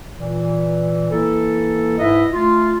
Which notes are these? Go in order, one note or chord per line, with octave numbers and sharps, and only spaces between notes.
A#2 E3
E3 A#3 E4 A4
G#2 E4 B4 D#5 E5
A3 F4